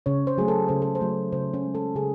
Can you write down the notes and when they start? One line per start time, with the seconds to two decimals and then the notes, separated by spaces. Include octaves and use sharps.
0.06 C#3 C#5
0.27 C5
0.38 F#3 A3 G#4
0.48 A4
0.69 C#3 C5
0.82 A4
0.95 C5
1.01 F#3 A3
1.32 C#3 C5
1.54 C#4
1.64 G#3
1.75 A4
1.95 C#3 G#4